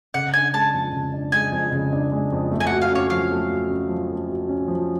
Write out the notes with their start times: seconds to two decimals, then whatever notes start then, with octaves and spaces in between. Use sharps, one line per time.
0.14 C#3 F#5
0.34 D4 G#5
0.53 G#3 A5
0.74 F2
0.93 C#3
1.14 D4
1.32 G#3 G#5
1.52 F2
1.72 C#3
1.93 D4
2.12 G#3
2.32 F2
2.52 A3
2.60 G#5
2.67 F#4 F#5
2.82 F5
2.91 C#4 C#5
3.10 F3 F5
3.31 A3
3.51 F#4
3.70 C#4
3.89 F3
4.10 A3
4.28 F#4
4.49 C#4
4.68 F3